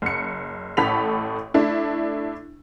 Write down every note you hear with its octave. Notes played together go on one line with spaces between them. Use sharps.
F#1 C#7
A1 A2 A4 B5 B6 F7
A3 D4 E4